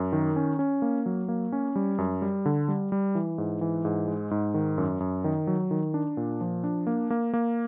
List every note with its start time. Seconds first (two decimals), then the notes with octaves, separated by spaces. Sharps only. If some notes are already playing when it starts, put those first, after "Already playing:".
Already playing: F#2
0.12 D#3
0.36 C#4
0.59 C#4
0.82 A#3
1.06 F#3
1.28 A#3
1.52 C#4
1.75 G3
1.98 F#2
2.22 G3
2.46 D3
2.68 G3
2.92 G3
3.15 E3
3.38 G#2
3.61 E3
3.85 G#2
4.08 G#3
4.31 G#2
4.54 D#3
4.78 F#2
5.00 F#2
5.24 D#3
5.47 F#3
5.71 D#3
5.94 D4
6.17 A#2
6.41 F3
6.64 D4
6.87 A#3
7.10 A#3
7.33 A#3